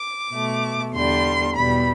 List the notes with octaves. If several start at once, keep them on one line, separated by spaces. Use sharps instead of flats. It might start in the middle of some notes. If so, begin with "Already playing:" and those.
Already playing: D6
B2 A3
E2 D3 G3 C6
E2 B2 G3 B5